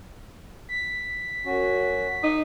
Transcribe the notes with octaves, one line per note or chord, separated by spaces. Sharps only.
B6
F#2 C#4 F#4
D#4